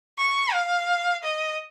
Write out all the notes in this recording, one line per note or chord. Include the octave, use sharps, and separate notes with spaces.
C#6
F5
D#5